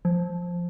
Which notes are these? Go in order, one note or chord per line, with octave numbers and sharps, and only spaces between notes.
F3